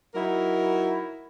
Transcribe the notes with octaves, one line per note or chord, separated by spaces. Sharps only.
F#3 D#4 E4 A#4